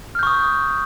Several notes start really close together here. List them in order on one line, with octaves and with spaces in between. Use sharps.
F6 G6 C#6 D#6